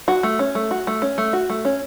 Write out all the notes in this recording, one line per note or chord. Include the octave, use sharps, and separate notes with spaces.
F#4
A3
C#4
A3
F#4
A3
C#4
A3
F#4
A3
C#4